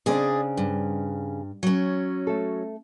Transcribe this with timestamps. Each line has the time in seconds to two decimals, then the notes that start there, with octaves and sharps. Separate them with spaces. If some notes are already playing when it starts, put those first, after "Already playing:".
0.06 C#3 C4 D4 G#4 D5 D#5
0.57 G2
1.63 F#3 C#4
2.27 A3 A4